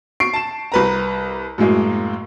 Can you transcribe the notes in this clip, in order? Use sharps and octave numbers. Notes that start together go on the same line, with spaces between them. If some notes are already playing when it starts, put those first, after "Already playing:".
C#6 C7 D7
A5 E7
C2 B4 A#5
F#2 A2 G#3 A#3